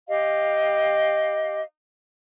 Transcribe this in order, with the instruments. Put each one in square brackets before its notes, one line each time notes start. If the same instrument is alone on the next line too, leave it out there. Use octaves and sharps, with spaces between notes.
[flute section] G4 D#5 F5